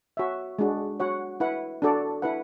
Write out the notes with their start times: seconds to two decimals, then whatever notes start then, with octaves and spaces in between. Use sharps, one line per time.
0.17 F#4 C#5 E5
0.59 G#3 D4 F#4
1.00 F#4 C#5 F#5
1.40 E4 B4 F#5
1.82 D4 F#4 A4 D5
2.22 E4 B4 F#5